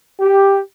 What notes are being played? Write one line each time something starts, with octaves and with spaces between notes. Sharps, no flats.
G4